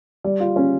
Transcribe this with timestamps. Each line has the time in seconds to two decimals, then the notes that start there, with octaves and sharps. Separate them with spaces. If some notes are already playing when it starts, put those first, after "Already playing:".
0.24 G3 D5
0.40 F4
0.56 C#4 C#5